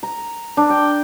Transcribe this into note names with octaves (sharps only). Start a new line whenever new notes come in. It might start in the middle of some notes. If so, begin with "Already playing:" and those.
A#5
D4
G5